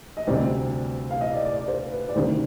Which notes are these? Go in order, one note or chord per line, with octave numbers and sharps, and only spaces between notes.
D#5
D2 C3 G3 C4 D5
F5
D#5
D5
D5
D5
C5
B4
D5
D2 C3 D#3 G3 C5